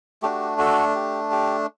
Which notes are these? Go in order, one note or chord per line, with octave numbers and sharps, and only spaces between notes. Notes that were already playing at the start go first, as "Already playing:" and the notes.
A3 D4 F#4 G4
F#4 A4
G4
G4